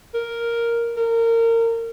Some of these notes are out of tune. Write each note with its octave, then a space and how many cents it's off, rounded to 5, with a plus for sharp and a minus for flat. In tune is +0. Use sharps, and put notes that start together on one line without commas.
A#4 +0
A#4 -25